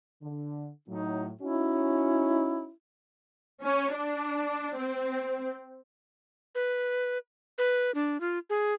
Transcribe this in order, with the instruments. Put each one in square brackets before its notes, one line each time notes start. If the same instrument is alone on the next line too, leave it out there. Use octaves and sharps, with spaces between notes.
[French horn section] D3
[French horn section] A2 F#3 [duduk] D#4
[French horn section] C#4 D#4 F#4 [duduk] E4
[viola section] C#4
D4
C4
[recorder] B4
B4
D4
F4
G#4